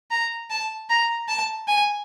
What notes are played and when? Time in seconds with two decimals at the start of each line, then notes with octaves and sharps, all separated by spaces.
0.11 A#5
0.50 A5
0.89 A#5
1.29 A5
1.68 G#5